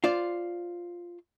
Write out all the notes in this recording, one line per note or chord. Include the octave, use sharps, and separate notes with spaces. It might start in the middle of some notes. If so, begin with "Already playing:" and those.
F4 C5 D5